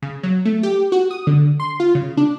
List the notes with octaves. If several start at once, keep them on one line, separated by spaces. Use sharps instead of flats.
C#3
F#3
A3
G4
F#4
D#6
D3
C6
F4
C#3
D4